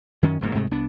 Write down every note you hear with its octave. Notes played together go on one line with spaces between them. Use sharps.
F#2 D#3 C#4
E1 G#2 A#3
G#2 C3 G#3 A3
C2 B3 D4